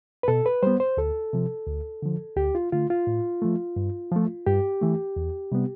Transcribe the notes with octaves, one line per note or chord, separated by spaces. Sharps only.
B4
B2 A4
B4
G3 B3 C5
C5
D2 A4
C3 F3
D2
D3 F3
D2 G4
F4
D3 A3 F4
F4
A2
F3 A3
G2
F3 A3
G2 G4
E3 A3
E2
C3 G3 B3